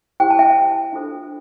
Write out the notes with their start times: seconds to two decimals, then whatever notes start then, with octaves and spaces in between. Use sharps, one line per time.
0.20 E4 G4 C5 G5
0.31 A5
0.39 E5 G5
0.92 D4 F4 A4 C5